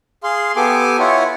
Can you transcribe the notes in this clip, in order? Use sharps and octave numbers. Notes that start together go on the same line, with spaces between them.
G#4 F5 C6
B3 G4 A4 G#5 D6
E4 F4 C#5 F#5